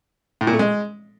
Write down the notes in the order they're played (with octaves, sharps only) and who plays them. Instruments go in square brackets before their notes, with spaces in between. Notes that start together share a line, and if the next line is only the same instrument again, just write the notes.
[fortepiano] A2
A#2
A3
G#3